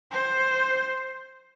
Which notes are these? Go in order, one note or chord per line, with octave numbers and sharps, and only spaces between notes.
C5